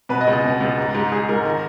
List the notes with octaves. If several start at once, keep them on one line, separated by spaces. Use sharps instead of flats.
B2 B4
D#5
C#2
D#5
B2
C#2
G#2
G#2
G#2 G#4
G#2 A#4
D#3 A#4